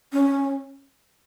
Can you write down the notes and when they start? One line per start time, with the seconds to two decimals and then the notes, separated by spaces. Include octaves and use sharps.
0.13 C#4